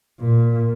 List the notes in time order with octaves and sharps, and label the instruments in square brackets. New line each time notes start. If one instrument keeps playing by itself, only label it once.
[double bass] A#2